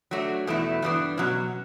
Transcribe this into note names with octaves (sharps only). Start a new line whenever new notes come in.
F#3 A3 D4 F#4
E2 B2 A3 E4
G2 E3 G3 B3 D4
B2 F#3 C#4